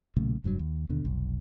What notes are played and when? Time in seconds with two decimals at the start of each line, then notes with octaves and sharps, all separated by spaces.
0.16 B1 A#2 C#3 A3
0.44 F1 G2 A#2 F#3
0.59 D#2
0.89 D#2 B2 D3
1.05 F1 B1